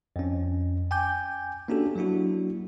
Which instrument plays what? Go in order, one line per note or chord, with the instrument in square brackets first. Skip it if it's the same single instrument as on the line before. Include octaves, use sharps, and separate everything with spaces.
[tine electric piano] F2 C#4
G5 G#5 D6 G6
A#3 C#4 D4 F#4 G4 A4
F#3 A#3 D4 E4 F#4